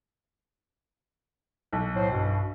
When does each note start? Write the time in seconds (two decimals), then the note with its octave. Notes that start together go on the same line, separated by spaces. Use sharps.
1.73 B1
1.95 A2 F#3 C5
2.11 G2 B2